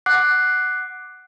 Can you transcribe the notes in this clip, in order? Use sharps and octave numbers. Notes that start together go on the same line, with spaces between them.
F#5 D6 F#6 C7